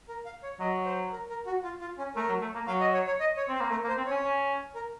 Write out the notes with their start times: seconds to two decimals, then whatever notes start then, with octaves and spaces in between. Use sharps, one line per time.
0.09 A#4
0.26 F5
0.43 C#5
0.60 F#3 D#5
0.85 C5
1.12 A#4
1.29 A#4
1.46 F#4
1.64 F4
1.81 F4
1.98 C#4
2.15 A3 A#4
2.29 F#3
2.41 A3
2.55 A#3
2.67 F#3 F5
2.81 D#5
2.94 C#5
3.07 C#5
3.20 D#5
3.37 C#5
3.49 C4
3.54 C5
3.61 A#3
3.71 A3 A#4
3.84 A#3
3.88 C5
3.98 C4
4.06 C#4 C#5
4.23 C#4
4.75 A#4